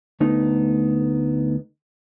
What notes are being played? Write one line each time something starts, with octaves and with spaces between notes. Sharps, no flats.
D2 A3 B3 D#4